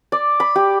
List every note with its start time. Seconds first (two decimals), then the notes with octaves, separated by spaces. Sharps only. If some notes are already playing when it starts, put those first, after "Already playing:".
0.12 D5
0.40 B5
0.56 G4